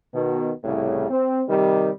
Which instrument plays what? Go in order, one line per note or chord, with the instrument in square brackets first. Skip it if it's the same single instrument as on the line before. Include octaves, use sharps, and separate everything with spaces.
[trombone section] B2 D#3
C2 A2 C#3
C4
C3 D#3 G3